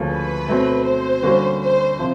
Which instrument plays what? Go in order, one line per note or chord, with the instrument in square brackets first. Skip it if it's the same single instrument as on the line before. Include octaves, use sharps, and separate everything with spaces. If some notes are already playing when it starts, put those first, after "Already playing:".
Already playing: [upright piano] D2 C#3 F3 A#3 C#4
[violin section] B4
[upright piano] B2 F#3 A3 C4
[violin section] C5
[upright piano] D3 G3 A#3 C#4 F#4
[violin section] C5
[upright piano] C3 F3